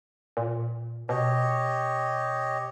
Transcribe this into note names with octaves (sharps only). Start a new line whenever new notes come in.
A#2
B2 G4 C#5 D#5